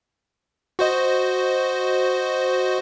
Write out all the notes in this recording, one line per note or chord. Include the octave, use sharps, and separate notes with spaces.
F#4 C5 D#5